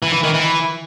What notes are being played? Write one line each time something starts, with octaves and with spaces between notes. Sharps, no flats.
E3
E3
D#3
E3